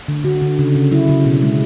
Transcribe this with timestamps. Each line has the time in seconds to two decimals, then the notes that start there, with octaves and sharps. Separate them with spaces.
0.08 D3
0.24 D3 F#4
0.42 D3
0.59 C#3
0.75 C#3
0.91 F#3 E4
1.09 C#3
1.25 B2
1.42 G#3